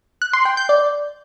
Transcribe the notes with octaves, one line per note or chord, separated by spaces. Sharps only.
F#6
C6
G5
G6
D5